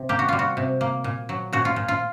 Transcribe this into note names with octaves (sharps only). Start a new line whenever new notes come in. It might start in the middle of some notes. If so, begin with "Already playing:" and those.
Already playing: C3
A#3 G4
F#4
G3 F4
F#4
C3
A#3
A#2
F#3
A#2 F#4
F4
A#2
F4